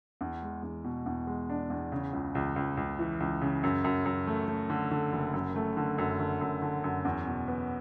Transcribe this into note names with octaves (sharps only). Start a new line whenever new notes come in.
E2
G#3
E2
B2
E2
G#3
D4
E2
C#3
C#2
C#2
C#2
C#2
E3
C#2
C#3
F#2
F#2
F#2
A3
A3
D3
D3
F#1
F#2
A3
D3
F#2
D3
F#2
D3
F#2
E2
B2
B3